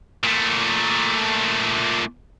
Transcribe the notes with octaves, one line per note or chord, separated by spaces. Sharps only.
A#2 A3